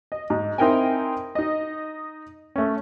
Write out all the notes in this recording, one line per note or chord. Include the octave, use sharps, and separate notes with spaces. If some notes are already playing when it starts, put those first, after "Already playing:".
D#5
G#2
C4 D#4 E4 A#4 G5 G#5
D#4 D#5
A3 C#4